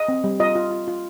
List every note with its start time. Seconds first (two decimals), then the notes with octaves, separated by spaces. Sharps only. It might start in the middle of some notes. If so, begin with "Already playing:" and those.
Already playing: D#5
0.08 C4
0.24 G3
0.40 F4 D#5
0.56 F4
0.71 F4
0.88 F4